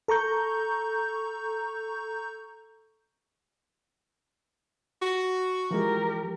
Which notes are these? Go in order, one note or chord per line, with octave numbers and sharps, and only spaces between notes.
A4 A#5 C#6 G6
F#4
E3 F3 G#3 G4 A#4